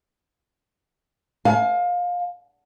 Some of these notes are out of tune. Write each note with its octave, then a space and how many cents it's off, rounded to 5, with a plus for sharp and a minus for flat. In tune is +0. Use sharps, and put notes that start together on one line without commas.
F5 +25 G#5 +45